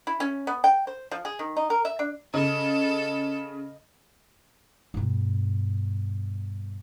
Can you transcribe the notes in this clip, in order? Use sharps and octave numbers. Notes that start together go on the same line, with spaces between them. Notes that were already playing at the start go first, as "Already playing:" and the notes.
E4
C#4
B3
G5
C5
F3
G#4
D#3
D#4
A#4
E5
D4
C#3 A4 D#5
G2 B2